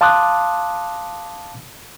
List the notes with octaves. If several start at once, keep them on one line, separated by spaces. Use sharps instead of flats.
F5 A5 C6 D6 D#6 F#6